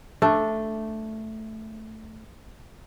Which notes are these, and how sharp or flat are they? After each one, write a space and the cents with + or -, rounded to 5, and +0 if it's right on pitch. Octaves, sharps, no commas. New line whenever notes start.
A3 +0 D4 +0